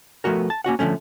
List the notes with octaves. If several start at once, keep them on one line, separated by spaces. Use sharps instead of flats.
F3 A3 B3 F#4 A#4
A5
A#3 C#4 F#4 F#5
D3 E3 F3 A3 C#4